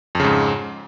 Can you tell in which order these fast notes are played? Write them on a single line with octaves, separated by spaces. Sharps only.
F2 C#3 G#2